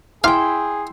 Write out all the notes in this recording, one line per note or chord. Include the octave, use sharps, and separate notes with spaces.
E4 G#4 F5 G5 C6